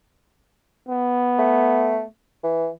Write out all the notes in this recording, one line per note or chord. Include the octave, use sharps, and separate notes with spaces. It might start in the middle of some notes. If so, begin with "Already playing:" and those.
B3
A3
E3